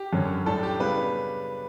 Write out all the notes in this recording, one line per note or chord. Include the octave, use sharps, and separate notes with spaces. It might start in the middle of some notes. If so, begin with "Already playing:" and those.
Already playing: G4
F#2 D3 F#3 C#4
A2 G3 D4 A4
G4
C#3 G3 B3 D4 B4